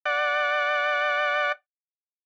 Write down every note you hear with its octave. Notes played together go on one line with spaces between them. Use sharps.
D5 F#5